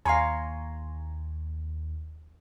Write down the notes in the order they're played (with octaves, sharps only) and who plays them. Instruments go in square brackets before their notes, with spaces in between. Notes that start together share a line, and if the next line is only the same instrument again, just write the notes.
[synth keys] D#2 [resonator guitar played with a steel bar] C#5 F5 [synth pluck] G#5 A#5 C6